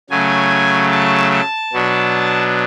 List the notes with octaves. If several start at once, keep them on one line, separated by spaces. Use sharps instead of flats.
C#3 F#3 A3 G#5
A5
A5
B2 F#3 B3 D4